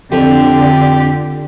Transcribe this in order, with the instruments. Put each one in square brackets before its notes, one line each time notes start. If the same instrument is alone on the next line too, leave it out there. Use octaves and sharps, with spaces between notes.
[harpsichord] F2 [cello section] D3 [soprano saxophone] G4